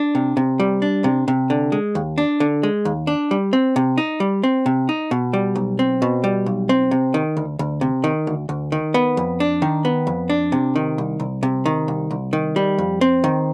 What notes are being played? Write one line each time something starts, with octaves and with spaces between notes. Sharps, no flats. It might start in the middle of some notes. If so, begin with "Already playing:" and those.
Already playing: D4
C3
C3
G3
D4
C3
C3
D3
G#3
D#2
D4
D3
G#3
D#2
D4
G3
C4
C3
D#4
G3
C4
C3
D#4
B2
G3
B1
C4
B2
G3
B1
C4
C3
D#3
D2
D2
C3
D#3
D2
D2
D#3
B3
F2
D4
D#3
B3
F2
D4
C3
D#3
C2
C2
C3
D#3
C2
C2
D#3
G3
F2
C4
D#3